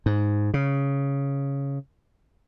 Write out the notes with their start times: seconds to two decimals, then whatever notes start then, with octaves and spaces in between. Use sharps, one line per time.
0.06 G#2
0.54 C#3